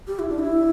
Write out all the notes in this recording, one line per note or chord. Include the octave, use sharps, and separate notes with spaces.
G4
E4
D4
E4